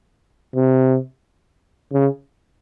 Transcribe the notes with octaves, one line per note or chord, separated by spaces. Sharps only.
C3
C#3